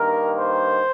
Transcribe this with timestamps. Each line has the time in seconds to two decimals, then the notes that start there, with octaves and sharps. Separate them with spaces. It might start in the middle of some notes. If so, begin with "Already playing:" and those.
Already playing: G2 D#3 A#3 A#4
0.36 C5